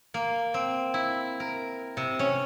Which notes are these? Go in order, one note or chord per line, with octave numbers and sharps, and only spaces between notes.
A#3
C4
E4
A#4
C3
C#4